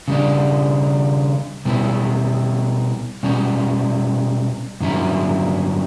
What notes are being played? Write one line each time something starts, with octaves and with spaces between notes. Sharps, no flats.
C#3 G3 D4
B2 G3 B3 E4
B2 G3 C#4
G2 D3 F#3 C#4 E4